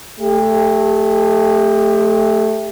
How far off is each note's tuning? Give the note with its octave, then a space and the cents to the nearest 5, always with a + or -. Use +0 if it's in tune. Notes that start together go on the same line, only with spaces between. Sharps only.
A3 +0 G4 +30